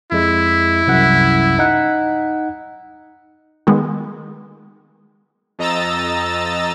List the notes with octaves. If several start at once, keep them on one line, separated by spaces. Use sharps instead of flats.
F2 G#3 E4
C2 F#2 F#5
D#4 F#5
D#3 G#3 B3
F2 D#5 A#5 E6 A6